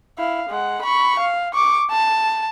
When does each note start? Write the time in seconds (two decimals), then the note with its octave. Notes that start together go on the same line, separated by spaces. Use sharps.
0.18 E4 F5
0.50 G#3 F#5
0.82 B5 C#6
1.20 F5
1.53 C#6 D6
1.91 A5